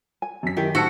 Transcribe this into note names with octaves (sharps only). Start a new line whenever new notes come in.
G#5
F#2 B6
D#3 E4 G4 A#4
A2 D#4 F#4 C5 A5 E6 C#7